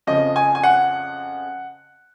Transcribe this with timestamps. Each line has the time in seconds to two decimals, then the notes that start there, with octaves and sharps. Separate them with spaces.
0.07 F2 C#3 F3 D#5
0.36 G#5
0.55 G#5
0.64 F#5